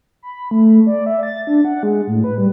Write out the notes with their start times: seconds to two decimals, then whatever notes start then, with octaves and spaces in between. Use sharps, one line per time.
0.23 B5
0.51 A3
0.86 D5
1.06 E5
1.23 A6
1.47 D4
1.65 F#5
1.83 G#3
2.07 A2
2.24 B4
2.38 G3